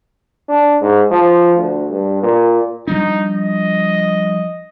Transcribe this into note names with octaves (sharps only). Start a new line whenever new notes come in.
D4
G#2
F3
D2
G2
A#2
F3 G3 D4 D#4
D#5